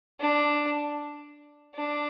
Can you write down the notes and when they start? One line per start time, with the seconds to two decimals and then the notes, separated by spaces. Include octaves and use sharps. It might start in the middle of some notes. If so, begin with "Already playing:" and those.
0.20 D4
1.75 D4